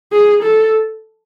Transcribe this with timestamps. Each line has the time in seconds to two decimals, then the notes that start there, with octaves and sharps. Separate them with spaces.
0.13 G#4
0.43 A4